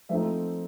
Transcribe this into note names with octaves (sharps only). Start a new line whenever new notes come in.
F3 A3 C4 D#4 E5